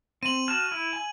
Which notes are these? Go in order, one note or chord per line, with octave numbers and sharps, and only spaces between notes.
C4 D#7 F#7
F#4 A5 F6
E4
G#5